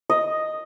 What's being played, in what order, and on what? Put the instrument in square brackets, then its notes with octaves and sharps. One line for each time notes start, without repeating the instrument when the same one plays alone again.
[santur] D#5